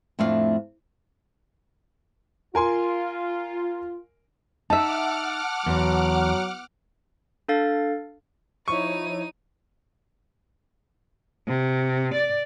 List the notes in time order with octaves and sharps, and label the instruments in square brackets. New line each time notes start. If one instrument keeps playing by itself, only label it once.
[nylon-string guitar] F2 A2 A3 D4 D5 F5
[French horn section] F4 [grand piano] A#4 G#5 C6
[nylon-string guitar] D#4 E5 [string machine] F#5 D6 F6 [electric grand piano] A5 E6
[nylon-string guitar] E2 [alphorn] F#3
[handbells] D4 A4 F5 A6
[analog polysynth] F3 E4 C#5 [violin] D#4 D#7 [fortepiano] C#6
[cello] C3
D5